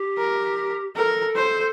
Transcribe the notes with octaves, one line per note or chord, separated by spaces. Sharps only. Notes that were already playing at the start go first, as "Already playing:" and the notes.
Already playing: G4
A#4
A4 A#4
C5